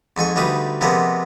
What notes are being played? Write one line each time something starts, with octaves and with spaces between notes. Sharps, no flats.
F2 G#2 G#5 C#6
D2 G3 D#4 B4
C3 F3 G#3 A#3 B3